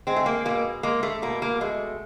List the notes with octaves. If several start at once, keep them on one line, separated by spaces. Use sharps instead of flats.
G#3 C4
A3
A#3
B2 A#3
G#3 A#3
A3
B2 A#3
A#3
G#3 A3